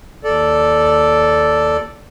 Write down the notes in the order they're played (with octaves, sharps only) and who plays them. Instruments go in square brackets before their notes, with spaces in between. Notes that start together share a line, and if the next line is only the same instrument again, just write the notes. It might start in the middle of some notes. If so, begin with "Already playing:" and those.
[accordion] D#2 A4 D5